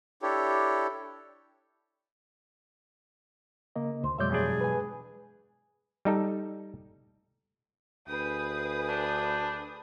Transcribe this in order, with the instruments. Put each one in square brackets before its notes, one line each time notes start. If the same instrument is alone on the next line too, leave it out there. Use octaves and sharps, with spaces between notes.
[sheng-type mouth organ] D4 E4 G4 A4 C#5
[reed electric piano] C#3 A#3 D#5
[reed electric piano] D2 [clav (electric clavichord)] C5
[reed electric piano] F2 C#5 G6 [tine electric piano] B2 F#3 G#3 [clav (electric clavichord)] D5 E5
[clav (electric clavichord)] E2 G2 D4 [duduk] G#4
[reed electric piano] B4 G#5
[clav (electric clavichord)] G3 D#4 A4
[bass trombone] D2 [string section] G#4 B4 D#6 [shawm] G5
[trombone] D4